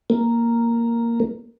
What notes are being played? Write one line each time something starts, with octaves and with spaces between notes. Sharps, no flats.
A#3